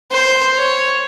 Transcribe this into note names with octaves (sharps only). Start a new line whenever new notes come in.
C5
C#5